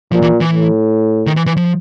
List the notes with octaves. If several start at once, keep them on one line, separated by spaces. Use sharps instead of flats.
A#2 F3
E3
E3
A2
D#3
E3
E3
F3